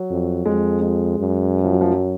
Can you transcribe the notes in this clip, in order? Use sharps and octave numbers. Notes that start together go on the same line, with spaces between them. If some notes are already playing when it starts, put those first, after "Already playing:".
Already playing: F#3
F2
F2 G#3
G#3
F#2
F3
F#3
F3
F#3